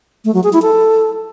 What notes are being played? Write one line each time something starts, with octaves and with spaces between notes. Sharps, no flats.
A3
F#3
G#4
E4
A4